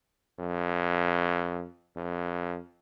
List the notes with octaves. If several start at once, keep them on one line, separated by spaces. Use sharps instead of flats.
F2
F2